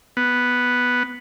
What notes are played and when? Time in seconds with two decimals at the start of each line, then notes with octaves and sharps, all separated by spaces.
0.17 B3